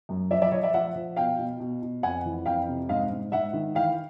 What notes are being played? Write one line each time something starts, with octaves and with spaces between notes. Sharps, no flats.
F#2
F3 D5 E5
D5 E5
F3 C#5 D#5
D5 E5
F3 E5 F#5
F3
B2 F5 G5
B2
B2
B2
F2 F#5 G#5
E3
F2 F5 G5
C3
G#2 D#5 F5
G#2
G#2 E5 F#5
D#3
E3 F5 G5